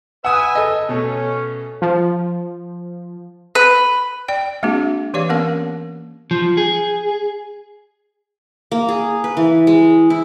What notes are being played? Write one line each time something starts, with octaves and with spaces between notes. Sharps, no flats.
B4 E5 F#5 G#5 D#6
A4 D#5
B2 A3 C#4
F3
B4
D5 G5
G#3 A#3 C4 D4 F#4 G#4
E3 G4 C#5 D5 F5
A#3 B3 C#4 A#4 F5
F3
G#4
A#3
G#4
B4
E3
G#3
E4